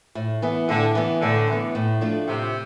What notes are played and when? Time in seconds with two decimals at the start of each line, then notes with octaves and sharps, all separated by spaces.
0.15 A2
0.42 E3 B3
0.68 A2 D3
0.95 E3 B3
1.21 A2 D3
1.48 E3 B3
1.75 A2
2.01 F3 A3 D4
2.28 A2 C3